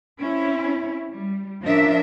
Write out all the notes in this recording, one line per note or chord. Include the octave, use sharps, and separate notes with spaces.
C4 C#4 E4
G3
F3 C#4 D4 A#4 E5